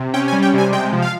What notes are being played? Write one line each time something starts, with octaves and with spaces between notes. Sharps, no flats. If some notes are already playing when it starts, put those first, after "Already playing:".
Already playing: C3
C#4 G5
G#5
G3
G5
C3 G#5
G#3 G5
F3
F5